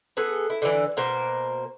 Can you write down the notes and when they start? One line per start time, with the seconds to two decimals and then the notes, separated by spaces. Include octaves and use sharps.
0.17 B3 G#4 A4
0.50 E4
0.62 D3 E3
0.97 B2 A#3 A#4 C5